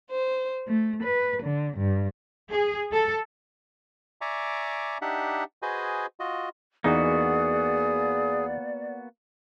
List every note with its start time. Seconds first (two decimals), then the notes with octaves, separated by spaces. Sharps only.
0.11 C5
0.68 A3
1.04 B4
1.44 D3
1.77 G2
2.51 G#4
2.92 A4
4.21 D5 E5 G#5 A#5 C#6 D6
5.02 D4 D#4 G4 E5 F#5
5.62 F#4 G#4 B4 C5 D#5 G#5
6.20 F4 F#4 D#5
6.84 E2 A#3 B3 D#4 F#4 G#4 D5